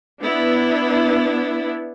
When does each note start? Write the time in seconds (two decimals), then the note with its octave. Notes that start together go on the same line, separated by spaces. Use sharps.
0.22 B3 D4 E4